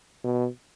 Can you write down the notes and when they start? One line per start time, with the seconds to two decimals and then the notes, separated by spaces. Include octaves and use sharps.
0.24 B2